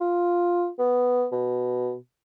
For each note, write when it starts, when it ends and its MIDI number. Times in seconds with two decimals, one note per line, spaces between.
0.01 0.68 65
0.79 1.26 59
1.32 1.95 47